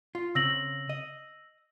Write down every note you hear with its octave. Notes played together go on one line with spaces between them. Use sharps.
F4
C#3 C4 E6 A#6 F#7
D#5